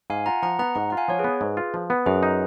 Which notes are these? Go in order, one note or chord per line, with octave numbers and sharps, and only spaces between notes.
G#2 F5 G#5
F4 F#5 A#5
F3 F#5 A#5
B3 F#5 A#5
G#2 F#5 A#5
F4 F#5
F5 G#5
F3 C#5
G#4 B4
B3
G#2
F4
F3
B3
F#2 G#4 B4
D#4